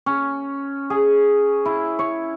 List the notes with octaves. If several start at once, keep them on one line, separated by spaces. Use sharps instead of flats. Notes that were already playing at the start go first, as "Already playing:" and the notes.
C#4
G#4
E4
C#5